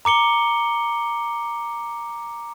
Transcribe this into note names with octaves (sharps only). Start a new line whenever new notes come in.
A#5 D6 C#7 G7